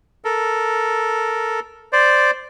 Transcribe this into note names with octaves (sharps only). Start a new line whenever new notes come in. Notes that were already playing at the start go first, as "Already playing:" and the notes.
A4 A#4
C5 D5